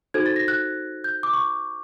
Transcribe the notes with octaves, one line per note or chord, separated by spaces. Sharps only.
D#4 F#4 A4 C5 G#6
A6
A#6
F#6
G6
D6
C#6